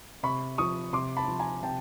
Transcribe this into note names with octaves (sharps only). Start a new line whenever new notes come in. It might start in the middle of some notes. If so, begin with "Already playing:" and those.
C3 B5 C#6
F3 C#6 D#6
C3 C6 D6
A5 B5
F3
G#5 A#5
C3 G5 A5